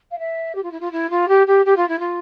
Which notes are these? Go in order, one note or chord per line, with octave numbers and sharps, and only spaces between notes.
F5
E5
G4
F4
E4
F4
E4
F4
G4
G4
G4
F4
E4
F4